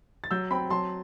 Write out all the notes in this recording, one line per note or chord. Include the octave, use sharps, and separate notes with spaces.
A6
F#3 E6 G6
C4 G5 B5
F#3 A5 C6